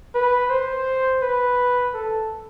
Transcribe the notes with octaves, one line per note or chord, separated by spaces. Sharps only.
B4
C5
B4
A4